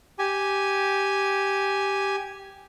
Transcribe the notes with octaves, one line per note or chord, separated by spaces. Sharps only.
G4 G#5